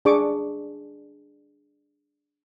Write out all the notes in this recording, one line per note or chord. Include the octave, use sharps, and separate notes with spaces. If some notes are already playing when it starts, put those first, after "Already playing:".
D4 G#4 D5 C#6 D6